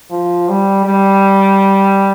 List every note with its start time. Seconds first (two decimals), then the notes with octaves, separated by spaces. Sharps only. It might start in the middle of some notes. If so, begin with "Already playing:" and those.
0.11 F3
0.49 G3
0.85 G3